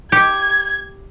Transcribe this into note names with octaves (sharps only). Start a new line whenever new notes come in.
G4 G#6